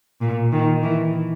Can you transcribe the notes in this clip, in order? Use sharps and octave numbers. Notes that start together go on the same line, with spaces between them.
A#2
D#3
E3